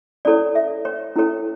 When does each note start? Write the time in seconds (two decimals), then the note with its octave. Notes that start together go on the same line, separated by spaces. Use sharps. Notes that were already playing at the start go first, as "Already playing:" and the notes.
0.25 C#4 E4 A4 C#5 D5
0.55 E5
0.85 C#5
1.16 C#4 E4 A4 C#5